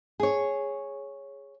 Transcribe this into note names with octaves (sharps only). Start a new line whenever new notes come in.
G#4 C#5